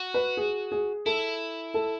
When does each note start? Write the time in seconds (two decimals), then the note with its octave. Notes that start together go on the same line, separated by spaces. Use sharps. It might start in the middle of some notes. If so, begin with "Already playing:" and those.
Already playing: F#4
0.14 B4
0.37 G#4
0.72 G#4
1.06 E4 A4
1.74 A4